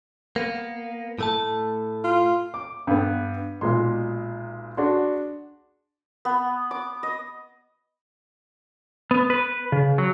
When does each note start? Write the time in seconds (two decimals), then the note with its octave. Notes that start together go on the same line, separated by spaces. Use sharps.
0.36 A#3 B3
1.19 A2 A3 A5
2.04 F4
2.54 D6
2.87 G2 B3
3.61 B1 A#2 G#3 C6
4.77 D4 F#4 G#4 C6
6.25 B3
6.71 D6
7.03 D#5
9.11 B3
9.30 B4
9.72 C#3
9.98 F#3